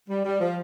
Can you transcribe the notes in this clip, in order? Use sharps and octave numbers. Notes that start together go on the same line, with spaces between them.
G3
G3
F3